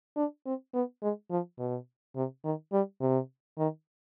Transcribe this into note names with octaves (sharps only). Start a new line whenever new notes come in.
D4
C4
B3
G#3
F3
B2
C3
D#3
G3
C3
D#3